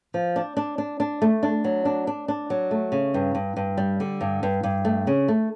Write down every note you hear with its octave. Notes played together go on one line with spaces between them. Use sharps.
F3
D4
D4
D4
D4
A3
D4
F#3
D4
D4
D4
F#3
A3
C#3
G2
G2
G2
G3
D3
G2
G2
G2
A3
C#3
A3